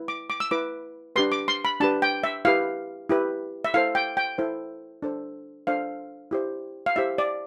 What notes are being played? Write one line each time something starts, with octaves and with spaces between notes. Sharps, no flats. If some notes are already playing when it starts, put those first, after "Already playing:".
Already playing: E4 B4
D6
D6
E6
E4 B4 D6
D4 G4 B4 C6
D6
C6
B5
D4 G4 B4 A5
G5
E5
E4 G4 B4 F5
E4 G4 B4
E5
E4 A4 C5 F5
G5
G5
E4 A4 C5
D4 A4 C5
D4 A4 C5 F5
E4 G4 C5
F5
E4 G4 C5 E5
D5